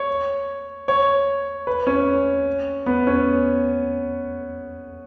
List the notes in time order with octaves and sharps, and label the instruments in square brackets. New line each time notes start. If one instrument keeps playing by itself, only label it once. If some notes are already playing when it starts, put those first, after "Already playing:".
Already playing: [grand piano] C#5
C#5
B4
C#4
B3
C#4